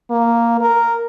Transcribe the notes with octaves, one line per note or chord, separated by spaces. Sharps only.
A#3
A#4